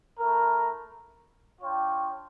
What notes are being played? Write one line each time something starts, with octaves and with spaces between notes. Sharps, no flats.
A3 E4 A#4
D4 F4 C#5 G5